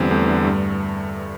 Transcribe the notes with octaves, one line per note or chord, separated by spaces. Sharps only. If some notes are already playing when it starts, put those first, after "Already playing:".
Already playing: E2 D3 G3 C4
E2 A3
D3
G2